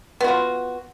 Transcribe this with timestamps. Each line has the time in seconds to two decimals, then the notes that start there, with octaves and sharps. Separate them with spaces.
0.20 B3
0.24 F#4
0.28 F4